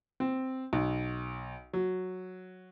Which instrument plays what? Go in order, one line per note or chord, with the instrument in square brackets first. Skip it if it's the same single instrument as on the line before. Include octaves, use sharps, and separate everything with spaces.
[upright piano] C4
B1
F#3